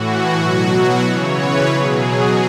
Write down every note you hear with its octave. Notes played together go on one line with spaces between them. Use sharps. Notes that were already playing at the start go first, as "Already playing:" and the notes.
Already playing: A2 E3 F#4
B2 F#3
C#3 E3 C#5
B4
B2 F#3 G#4